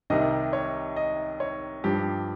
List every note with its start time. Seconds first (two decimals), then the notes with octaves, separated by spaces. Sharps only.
0.10 C2 C3 D#3 D#5
0.53 C#5
0.96 D#5
1.40 C#5
1.84 G2 F3 G4